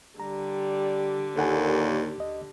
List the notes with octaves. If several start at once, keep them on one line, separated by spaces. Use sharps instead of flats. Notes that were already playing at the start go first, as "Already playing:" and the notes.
D3 G3 G4 A#5
D#2 A#2 A4 F#5 G#5
D2 D#5